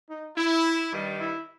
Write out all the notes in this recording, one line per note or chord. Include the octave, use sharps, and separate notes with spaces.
D#4
E4
G2 D#3 G3
E4